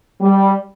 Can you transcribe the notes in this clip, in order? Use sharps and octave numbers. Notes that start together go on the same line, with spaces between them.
G3